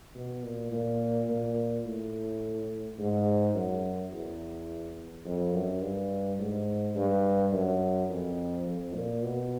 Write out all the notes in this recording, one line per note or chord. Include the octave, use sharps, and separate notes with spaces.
B2
A#2
A#2
A#2
A2
G#2
F#2
E2
F2
F#2
G2
G#2
G2
F#2
F2
F2
A#2
B2